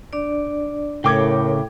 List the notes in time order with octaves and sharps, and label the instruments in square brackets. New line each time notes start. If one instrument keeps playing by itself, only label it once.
[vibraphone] D4 D5
[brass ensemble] A2 [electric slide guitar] C#3 [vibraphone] A#4 C#5 [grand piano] G5 D6 G#6